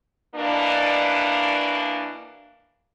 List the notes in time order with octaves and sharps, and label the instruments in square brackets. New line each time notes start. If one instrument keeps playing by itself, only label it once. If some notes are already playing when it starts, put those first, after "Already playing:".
[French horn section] B2 E3 A#3 D4